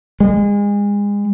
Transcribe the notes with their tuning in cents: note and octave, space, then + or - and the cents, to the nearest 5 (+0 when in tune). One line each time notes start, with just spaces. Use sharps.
G#3 -30